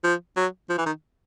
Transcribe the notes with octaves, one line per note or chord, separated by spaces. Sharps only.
F3
F#3
F3
E3
D#3